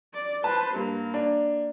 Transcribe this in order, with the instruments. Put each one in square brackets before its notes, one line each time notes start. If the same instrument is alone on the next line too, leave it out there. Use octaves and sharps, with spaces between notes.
[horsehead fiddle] D5
[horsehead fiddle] B4 C5 [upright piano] A5
[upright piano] G2 [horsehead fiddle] A#3
[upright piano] D4